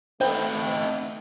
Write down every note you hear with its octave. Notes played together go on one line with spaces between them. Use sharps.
A3 B3 C4 D#4 C5 G5